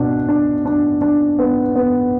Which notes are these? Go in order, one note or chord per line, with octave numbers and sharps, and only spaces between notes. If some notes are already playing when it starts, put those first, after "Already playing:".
Already playing: B2 D4
D4
D4
D4
B3
B3